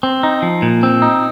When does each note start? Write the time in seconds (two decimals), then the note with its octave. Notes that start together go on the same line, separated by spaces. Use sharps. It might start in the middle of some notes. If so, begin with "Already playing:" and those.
0.03 C4
0.23 D#4
0.42 F3
0.62 A#2
0.83 C4
1.02 D#4